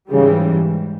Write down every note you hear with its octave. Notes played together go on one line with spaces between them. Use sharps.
G#2 C#3 E3 G3